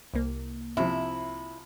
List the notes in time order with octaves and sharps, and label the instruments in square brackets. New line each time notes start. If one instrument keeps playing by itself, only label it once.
[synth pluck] C2 A#3
[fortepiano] C3 F3 [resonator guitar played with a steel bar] E4